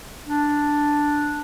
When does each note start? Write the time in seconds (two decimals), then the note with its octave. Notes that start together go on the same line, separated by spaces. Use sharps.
0.25 D4